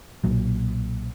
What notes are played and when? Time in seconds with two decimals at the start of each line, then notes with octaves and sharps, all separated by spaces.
0.24 B1 A#2 F#3